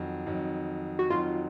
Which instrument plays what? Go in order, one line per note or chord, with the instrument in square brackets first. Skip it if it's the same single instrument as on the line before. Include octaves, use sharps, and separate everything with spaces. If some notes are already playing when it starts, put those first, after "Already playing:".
Already playing: [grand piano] F2 D#3 F#3
F2 D#3 F#3
[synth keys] F#4
[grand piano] F2 D#3 F#3 [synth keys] F4